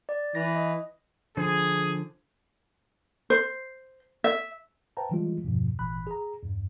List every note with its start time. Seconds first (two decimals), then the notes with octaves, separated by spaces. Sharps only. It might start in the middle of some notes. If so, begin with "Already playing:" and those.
0.09 D5
0.35 E3 A#6
0.56 D#5
1.37 D3 F3 G#4 C5
3.30 C5
4.24 E5
4.97 B4 C5 F5 G5 A5 A#5
5.11 D#3 E3 G3 G#3 F4
5.44 E2 G2 B2 F3
5.79 G#1 A#2 E3 B5 F#6
6.07 G#4 A#5
6.42 E2 G2